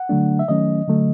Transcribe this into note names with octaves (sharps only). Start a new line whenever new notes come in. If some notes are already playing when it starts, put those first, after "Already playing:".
Already playing: F#5
D3 F#3 A3 D4
E5
D#3 F#3 A3 C#4 D#5
D3 F#3 A3